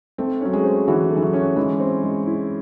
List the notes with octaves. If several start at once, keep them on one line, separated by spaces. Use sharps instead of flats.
A3 C4
F#3 C#4
G#3
C5
E3 F#4
A3
E3
F#3
C#4
E3 G#3
C4
G#3
E4